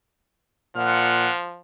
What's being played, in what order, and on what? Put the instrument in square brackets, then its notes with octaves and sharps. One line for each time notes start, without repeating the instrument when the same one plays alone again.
[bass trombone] A#2 [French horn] F3 [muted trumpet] F#5 [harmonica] F6